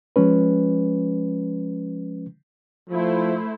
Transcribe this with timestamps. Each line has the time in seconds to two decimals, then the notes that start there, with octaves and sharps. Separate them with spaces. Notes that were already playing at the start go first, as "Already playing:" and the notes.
0.16 F3 G#3 C#4 B4
2.90 F3 A3 E4 C5